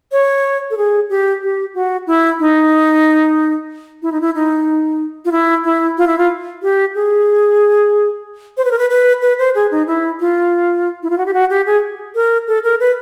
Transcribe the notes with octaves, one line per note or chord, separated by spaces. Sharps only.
C#5
A4
G#4
G4
G4
F#4
E4
D#4
E4
D#4
E4
D#4
F4
E4
E4
F4
E4
F4
G4
G#4
C5
B4
A#4
B4
B4
B4
C5
G#4
D#4
E4
F4
E4
F4
F#4
G4
F#4
G4
G#4
A#4
A4
A#4
B4